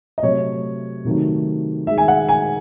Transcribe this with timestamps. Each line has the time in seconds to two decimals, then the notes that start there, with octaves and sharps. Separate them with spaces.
0.18 D#5
0.23 C3 F#3 A3 C#5
1.05 C3 D#3 F#3 A3
1.87 D#3 G#3 E5
1.98 G#5
2.08 F#5
2.29 G#5